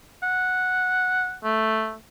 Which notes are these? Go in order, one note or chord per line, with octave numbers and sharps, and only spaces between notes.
F#5
A3